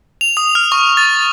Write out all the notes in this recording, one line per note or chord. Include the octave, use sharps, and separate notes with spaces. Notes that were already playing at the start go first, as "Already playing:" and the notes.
F7
D#6
F6
C#6
A6